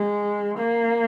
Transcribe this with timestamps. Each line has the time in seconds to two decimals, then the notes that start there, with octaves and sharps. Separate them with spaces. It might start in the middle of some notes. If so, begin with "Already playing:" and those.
Already playing: G#3
0.58 A#3